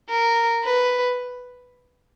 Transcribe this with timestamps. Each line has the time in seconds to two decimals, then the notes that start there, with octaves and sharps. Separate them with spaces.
0.09 A#4
0.64 B4